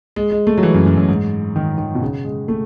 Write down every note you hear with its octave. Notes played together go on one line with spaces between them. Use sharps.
G#3
G#3
A3
F#3
E3
F#2
F#2
F#2
G#2
D#3
D#3
B2
C#3
G#3
A3